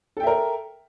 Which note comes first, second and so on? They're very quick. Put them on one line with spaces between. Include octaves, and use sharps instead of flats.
A4 G5 E5 A#4